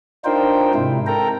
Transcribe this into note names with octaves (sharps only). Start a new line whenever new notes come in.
D4 D#4 F4 A#4 C5 G5
G#2 C3 E4
A4 A#4 G5 A#5